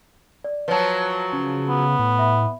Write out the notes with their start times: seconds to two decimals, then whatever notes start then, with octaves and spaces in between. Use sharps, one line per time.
0.44 D5
0.68 F3 F#3 B4 C#5 A5
1.33 C#3
1.69 B3
1.99 A2
2.19 E5 B5